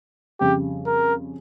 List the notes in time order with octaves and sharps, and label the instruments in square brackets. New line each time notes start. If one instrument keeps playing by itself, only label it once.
[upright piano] F2 C#3 G3 [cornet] G4
[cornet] A#4